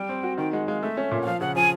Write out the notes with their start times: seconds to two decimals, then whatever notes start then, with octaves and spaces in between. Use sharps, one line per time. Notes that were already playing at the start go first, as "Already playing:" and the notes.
Already playing: G3 G5
0.09 C4
0.23 F#4
0.38 D#3 G5
0.53 G#3 F#5
0.68 G#3 F5
0.82 A3 E5
0.97 C#4
1.11 A#2
1.22 F#5
1.26 F3 F5
1.41 C#3 F#5
1.56 F3 G#5